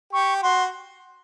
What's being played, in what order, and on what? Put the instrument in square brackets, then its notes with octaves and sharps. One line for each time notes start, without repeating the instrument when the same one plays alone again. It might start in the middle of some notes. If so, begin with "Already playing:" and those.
[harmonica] G4 [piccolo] C#6
[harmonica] F#4 [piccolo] C6